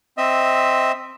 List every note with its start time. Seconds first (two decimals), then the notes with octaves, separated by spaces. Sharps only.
0.18 C4 D#5 E5